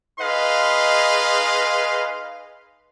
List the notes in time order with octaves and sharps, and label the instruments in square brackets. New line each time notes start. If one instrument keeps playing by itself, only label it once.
[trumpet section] D#4 G#4 B4 D#5 F5 C6